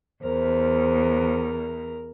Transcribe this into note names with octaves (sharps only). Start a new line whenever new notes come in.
E2 A#4 C5